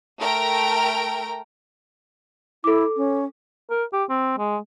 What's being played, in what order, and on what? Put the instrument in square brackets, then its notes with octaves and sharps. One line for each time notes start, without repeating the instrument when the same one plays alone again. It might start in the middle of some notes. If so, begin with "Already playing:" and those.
[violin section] A3 A#4 G5 A#5 D7
[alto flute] E4 [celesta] A4 D6
[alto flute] C#4
[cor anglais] A#4
G4
C4
G#3